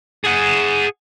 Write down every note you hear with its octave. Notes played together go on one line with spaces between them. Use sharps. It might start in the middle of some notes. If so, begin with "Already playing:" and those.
G#4 F#5